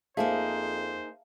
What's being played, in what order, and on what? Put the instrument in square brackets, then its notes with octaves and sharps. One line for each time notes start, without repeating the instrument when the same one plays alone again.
[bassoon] F2 [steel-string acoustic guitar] A#3 D#4 G#4 [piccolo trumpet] C5 [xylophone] E5 F5 A5